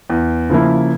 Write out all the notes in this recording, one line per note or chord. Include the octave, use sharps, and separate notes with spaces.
E2
C#3 F3 A#3 E4